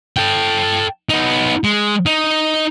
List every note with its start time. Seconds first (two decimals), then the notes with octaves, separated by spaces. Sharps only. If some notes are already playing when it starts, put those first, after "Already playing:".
0.17 A4 G5
1.09 B3 D#4
1.64 G#3
2.06 D#4